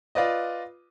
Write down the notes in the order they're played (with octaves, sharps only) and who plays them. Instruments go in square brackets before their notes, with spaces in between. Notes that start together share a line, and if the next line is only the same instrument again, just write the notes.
[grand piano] F4 B4 D5 D#5